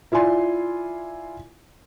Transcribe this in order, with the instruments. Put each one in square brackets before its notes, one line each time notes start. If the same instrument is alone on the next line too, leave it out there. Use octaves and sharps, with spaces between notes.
[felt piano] E4 F4 D5 G#5 C6